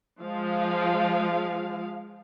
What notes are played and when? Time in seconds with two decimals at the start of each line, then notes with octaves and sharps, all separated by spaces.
0.19 F3 G#3 F5